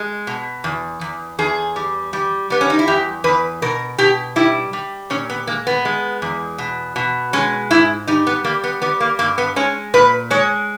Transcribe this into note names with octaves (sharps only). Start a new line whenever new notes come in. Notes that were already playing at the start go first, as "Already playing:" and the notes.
Already playing: G#3
B2
E2
E2
E2 G#4
G3
G3
G3 B3
C#4
D#4
E4
E2 G4
E2 B4
B2 A#4
B2 G4
G3 E4
G3
A#2 C#4
B3
G#3 A#3
B3
G#3
E2
B2
B2
G#3 C#4
G#2 E4
G3 D#4
B3
G3 A#3
B3
G3 B3
A#3
G2 A#3
B3
G#3 C#4
A#2 B4
G#3 C#5